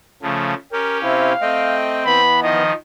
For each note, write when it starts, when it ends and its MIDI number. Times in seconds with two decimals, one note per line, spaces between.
0.22 0.54 49
0.22 0.54 53
0.22 0.54 57
0.72 1.33 61
0.72 1.33 67
0.72 0.98 70
1.03 1.33 48
1.03 1.33 60
1.03 1.33 64
1.03 1.76 77
1.41 2.04 57
1.41 2.20 60
1.41 2.04 75
1.41 2.04 79
2.05 2.62 52
2.05 2.62 59
2.05 2.41 83
2.42 2.73 51
2.42 2.73 53
2.42 2.75 75